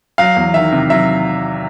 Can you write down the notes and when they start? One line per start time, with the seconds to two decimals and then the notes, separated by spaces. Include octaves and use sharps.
0.18 F#3 F5
0.36 E2
0.54 D#3 E5
0.72 C3
0.90 F#3 E5